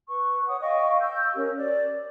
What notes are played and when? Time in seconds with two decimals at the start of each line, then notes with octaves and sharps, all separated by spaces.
0.09 B4 C#6
0.48 C#5 F#5 D#6
0.61 D#5 F5 G5 C#6
1.00 E6 G6
1.35 C#4 G4 A#4
1.57 D5